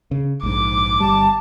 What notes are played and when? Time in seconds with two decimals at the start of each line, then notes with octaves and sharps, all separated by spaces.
0.11 C#3
0.43 A#1 G#2 D6
1.00 G1 G3 A5